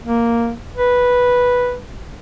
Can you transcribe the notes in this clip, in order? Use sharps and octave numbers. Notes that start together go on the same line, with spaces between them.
A#3
B4